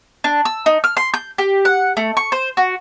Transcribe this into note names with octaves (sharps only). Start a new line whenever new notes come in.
D4
E6
D#4
F6
C6
G6
G4
F#5
A3
C#6
C5
F#4